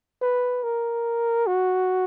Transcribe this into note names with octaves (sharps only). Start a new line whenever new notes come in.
B4
A#4
F#4